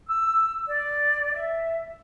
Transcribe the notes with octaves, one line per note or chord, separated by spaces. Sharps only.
E6
D5
E5